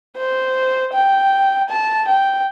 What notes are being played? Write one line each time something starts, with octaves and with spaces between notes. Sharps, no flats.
C5
G5
A5
G5